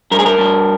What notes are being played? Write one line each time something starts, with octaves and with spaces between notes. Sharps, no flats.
G2 A#4
G#4
A#4
G2